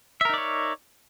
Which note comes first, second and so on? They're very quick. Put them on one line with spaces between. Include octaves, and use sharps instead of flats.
E5 A#4 D#4 D5 C#5